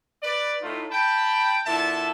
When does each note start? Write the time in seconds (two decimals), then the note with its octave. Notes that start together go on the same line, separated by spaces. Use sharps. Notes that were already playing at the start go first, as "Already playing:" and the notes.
0.23 B4 D5
0.62 A2 D#4 F4
0.91 G5 A5 B5
1.66 A#2 D3 E4 E5 A5